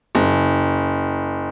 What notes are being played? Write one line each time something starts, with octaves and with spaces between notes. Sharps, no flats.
F#1